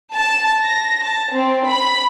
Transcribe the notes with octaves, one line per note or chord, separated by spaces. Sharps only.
A5
A#6
A5
C4
B5